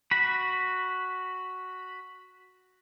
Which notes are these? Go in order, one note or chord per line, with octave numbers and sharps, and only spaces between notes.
F#4 B5